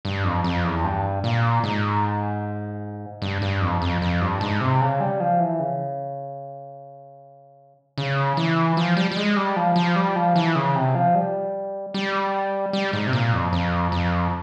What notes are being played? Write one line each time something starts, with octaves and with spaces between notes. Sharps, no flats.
G2
F2
F2
E2
G2
A#2
G#2
G2
G2
F2
F2
F2
G2
G#2
C3
C#3
G3
F3
E3
C#3
C#3
E3
F3
G3
G3
G#3
G3
F3
F3
G3
F3
E3
C#3
C3
F3
G3
G3
G3
G#2
C3
A#2
F2
F2
F2